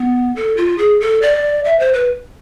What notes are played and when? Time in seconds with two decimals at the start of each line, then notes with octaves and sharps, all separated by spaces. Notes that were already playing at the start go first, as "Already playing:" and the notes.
Already playing: B3
0.36 A4
0.57 F4
0.78 G#4
1.01 A4
1.22 D5
1.65 E5
1.79 C5
1.93 B4